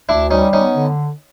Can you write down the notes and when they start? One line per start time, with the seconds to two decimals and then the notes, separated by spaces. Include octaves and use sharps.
0.08 D2 D4 E4
0.31 G3 C#4 D#4
0.53 B3 C#4 D#4
0.76 D3